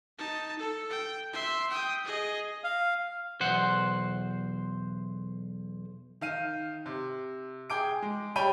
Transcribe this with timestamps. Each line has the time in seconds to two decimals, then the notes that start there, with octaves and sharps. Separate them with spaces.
0.18 D#4 A5
0.59 A4
0.90 G5
1.33 E5 C6
1.70 G5 D#6
2.05 G#4 D#5
2.64 F5
3.40 B1 E2 C5 F#5
6.21 D#3 F5 D#7
6.86 C3
7.70 G#4 G5 D6 D7
8.02 G#3
8.36 G3 C#5 G5 B5 C#6 D#7